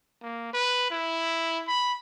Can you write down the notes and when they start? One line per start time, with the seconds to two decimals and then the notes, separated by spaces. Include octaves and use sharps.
0.22 A#3
0.53 B4
0.90 E4
1.67 B5